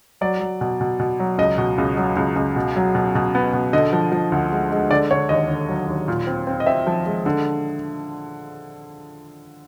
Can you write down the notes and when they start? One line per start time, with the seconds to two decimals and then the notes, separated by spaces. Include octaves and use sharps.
0.21 F#3 D5
0.40 F#3
0.61 B2
0.81 B2
0.99 B2
1.20 F#3
1.38 C#2 D#5
1.58 B2
1.78 C#2
1.97 F#3
2.16 C#2
2.36 C#2
2.56 B2
2.76 F#3
2.95 B2
3.15 B2
3.35 B3
3.53 B2
3.73 D3 D#5
3.93 F3
4.12 F3
4.32 D2
4.52 G#3
4.71 G#3
4.91 D3 D5
5.11 D3 C#5
5.29 D#2 D#5
5.49 D3
5.69 F#3
5.88 D#2
6.08 A#2
6.27 C4
6.47 C4
6.60 D#5
6.66 C4 E5
6.87 F3
7.06 G#3
7.26 D3